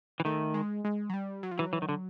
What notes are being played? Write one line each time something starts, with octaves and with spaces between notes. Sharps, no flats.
E3
D#3 A3
G#3
G#3
F#3
G3
F#3
F3
E3 F#3
E3
D#3
D3